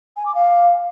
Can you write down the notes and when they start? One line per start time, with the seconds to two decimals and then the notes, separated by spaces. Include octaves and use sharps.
0.17 G#5
0.26 D6
0.35 F5